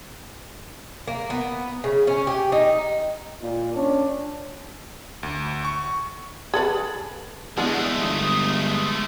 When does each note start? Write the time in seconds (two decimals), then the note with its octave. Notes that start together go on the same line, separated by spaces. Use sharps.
1.07 A#3
1.30 B3
1.84 C#3
2.07 C#4
2.27 G4
2.52 D#4
3.41 A#2
3.74 C#4 D4
5.23 D2
5.65 C#6
6.54 G#4 A4 B4
7.58 E2 G#3 A3 B3 D4 G#4
8.01 G1 D#6